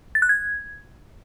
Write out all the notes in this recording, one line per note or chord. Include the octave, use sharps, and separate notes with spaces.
A6
F#6
G#6